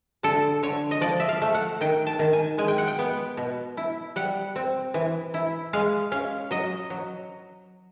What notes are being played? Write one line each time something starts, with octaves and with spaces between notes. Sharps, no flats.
D3 A4
D3 C#5
D#5
F3 D5
E5
F5
A3
F#5
D#3 G5
A5
D#3
G#5
G#3 G#5
G5
F#5
G5
B3
B2
E4
G3 F#5
C4
E3
E4
G#3 F5
C#4 F5
F#3 D#5
F#3